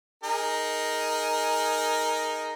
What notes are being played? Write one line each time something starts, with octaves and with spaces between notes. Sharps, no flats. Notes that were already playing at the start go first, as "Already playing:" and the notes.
D#4 G#4 A#4